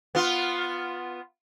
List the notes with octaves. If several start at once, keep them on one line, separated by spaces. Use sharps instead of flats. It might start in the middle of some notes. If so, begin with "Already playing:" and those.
B3 F4